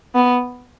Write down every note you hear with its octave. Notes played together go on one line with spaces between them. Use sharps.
B3